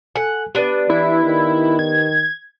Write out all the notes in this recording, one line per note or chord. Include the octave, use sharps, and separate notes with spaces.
A4 F#5 G#5
B3 D4 G4 B4
E3 E4
D#3
G#6